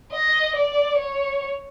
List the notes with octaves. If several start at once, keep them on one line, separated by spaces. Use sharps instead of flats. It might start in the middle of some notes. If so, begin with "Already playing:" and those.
D#5
D5
C#5